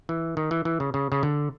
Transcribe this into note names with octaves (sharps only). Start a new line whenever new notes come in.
E3
D#3
E3
E3
C#3
C#3
C#3
D3